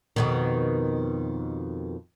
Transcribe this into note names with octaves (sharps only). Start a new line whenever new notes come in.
F2 B2 D#3